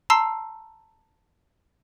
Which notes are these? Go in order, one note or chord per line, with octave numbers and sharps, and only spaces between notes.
A5 A#5 C6 E6 C7